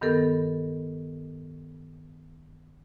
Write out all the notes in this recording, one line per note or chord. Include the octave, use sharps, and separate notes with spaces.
G2 D#3 B3 A4 A#4